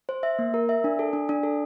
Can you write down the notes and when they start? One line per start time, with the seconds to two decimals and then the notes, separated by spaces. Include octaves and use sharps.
0.09 C5
0.23 E5
0.39 A#3
0.54 A#4
0.69 E5
0.84 D4
0.99 A4
1.13 D4
1.29 D4
1.43 A4